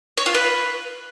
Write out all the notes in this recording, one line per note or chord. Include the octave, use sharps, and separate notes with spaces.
C#5
F4
B4